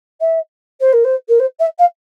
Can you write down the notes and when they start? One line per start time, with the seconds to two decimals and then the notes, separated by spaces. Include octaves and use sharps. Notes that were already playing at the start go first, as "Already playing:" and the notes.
0.20 E5
0.80 C5
0.92 A#4
1.04 C5
1.28 A#4
1.39 C5
1.59 E5
1.78 F5